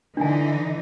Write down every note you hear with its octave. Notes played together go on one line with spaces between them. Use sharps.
D3 E3 D4 D#4 G#5